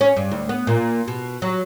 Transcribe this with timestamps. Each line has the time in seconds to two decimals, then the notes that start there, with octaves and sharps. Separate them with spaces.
0.01 C#4
0.17 G2
0.31 D2
0.49 B3
0.67 A#2
1.08 B2
1.42 F#3